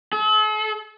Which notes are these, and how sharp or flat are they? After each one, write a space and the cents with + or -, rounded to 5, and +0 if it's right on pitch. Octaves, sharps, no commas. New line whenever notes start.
A4 -45